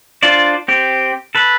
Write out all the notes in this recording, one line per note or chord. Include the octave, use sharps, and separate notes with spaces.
D4 F4 C5 D5
C4 G4
A4 B4